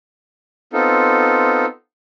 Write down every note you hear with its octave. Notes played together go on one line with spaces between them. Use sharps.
B3 C4 D#4 F4 A4